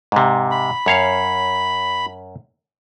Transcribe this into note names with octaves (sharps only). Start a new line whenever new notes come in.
G#2 C3
B5
F#2 C#5 F5